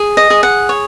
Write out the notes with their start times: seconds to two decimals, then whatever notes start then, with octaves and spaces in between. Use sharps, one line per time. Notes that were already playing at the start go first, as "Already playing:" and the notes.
Already playing: G#4
0.17 D#5
0.30 G#4
0.43 F#5
0.69 C#5